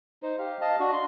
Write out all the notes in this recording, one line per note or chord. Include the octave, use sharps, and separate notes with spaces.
D#4 C5
G4 F5
D#5 F5 A5
D4 F#4
C6